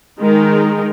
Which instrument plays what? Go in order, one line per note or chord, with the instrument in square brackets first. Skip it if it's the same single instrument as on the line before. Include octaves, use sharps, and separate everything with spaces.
[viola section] D#3 G#3 D#4 A#4